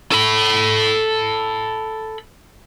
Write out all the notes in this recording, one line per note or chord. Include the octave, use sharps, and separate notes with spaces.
A4 B5